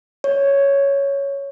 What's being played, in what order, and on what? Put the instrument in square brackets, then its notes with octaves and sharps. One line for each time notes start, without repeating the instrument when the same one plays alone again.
[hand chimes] C#5